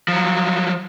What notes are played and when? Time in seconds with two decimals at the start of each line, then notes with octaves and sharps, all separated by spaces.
0.08 F3 F#3